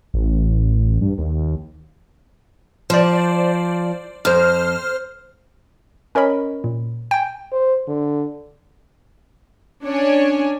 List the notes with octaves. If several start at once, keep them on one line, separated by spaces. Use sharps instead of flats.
A1
G2
D#2
F3 C5 D5
F2 C5 F6
C#4 A#4 C#5 D#5 B5
A#2
G5 G#5
C5
D3
C#4 D4 C#5 G#5